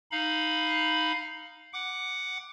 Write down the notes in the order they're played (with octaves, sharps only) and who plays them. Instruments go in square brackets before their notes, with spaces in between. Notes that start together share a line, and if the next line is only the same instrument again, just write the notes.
[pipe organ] D#4 F5 B5
F#5 D6